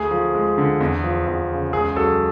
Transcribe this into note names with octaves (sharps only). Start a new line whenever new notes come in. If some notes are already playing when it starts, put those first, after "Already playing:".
Already playing: D2 G#4
F3
G#3
D3
E2
F3
E2
C#3
C#2 G#4
F#3 A4